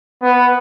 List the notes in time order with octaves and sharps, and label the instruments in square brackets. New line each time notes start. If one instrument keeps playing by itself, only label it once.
[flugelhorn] B3